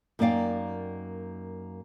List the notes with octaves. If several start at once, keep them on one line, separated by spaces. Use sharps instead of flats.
F#2 A#3 D#4 D5 F5 G5